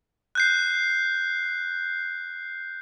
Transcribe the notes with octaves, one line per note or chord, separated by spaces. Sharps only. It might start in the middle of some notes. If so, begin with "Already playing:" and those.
F#6 G6 C7